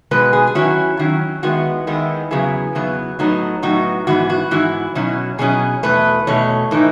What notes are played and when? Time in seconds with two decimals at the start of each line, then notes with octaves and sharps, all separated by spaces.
0.11 B2 G#3 B3 B4
0.33 G#4
0.47 G#4
0.55 D#3 F#3 C#4 E4 F#4
0.99 D#3 F#3 C#4 E4
1.43 D#3 G#3 B3 E4 F#4
1.87 D#3 G#3 B3 E4
2.31 E2 C#3 F#3 B3 E4 G#4
2.75 E2 C#3 F#3 B3 E4
3.19 A2 F#3 B3 D#4
3.62 A2 F#3 B3 D#4 F#4
4.07 G#2 E3 B3 E4 F#4
4.30 F#4
4.51 G#2 E3 B3 E4 F#4
4.95 B2 F#3 C#4 E4
5.39 B2 F#3 C#4 E4 G#4
5.83 E2 B2 A3 B4
6.27 E2 B2 A3 C#5
6.71 A2 E3 A3 D#4